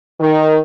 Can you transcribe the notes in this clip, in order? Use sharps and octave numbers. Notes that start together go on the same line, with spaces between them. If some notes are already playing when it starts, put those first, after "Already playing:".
D#3